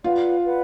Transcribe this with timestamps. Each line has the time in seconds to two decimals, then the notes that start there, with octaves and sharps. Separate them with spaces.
0.04 F4 B4 D5 F#5
0.44 B4 D5 F#5